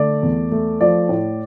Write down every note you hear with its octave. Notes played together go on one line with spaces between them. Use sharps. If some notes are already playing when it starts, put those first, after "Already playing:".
Already playing: D3 A3 D5
E2
A3
F3 D5
A2